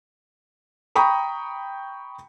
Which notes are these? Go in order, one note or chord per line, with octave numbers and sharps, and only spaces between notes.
G5 A#5 B5 C#6 D#6